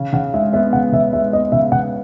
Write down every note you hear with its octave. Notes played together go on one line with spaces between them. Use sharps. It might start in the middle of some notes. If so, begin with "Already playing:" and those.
Already playing: C#3
C#3 F#5
G#3 E5
B3 E5
C#3 F#5
C#3 E5
G#3 E5
B3 D#5
C#3 E5
C#3 F#5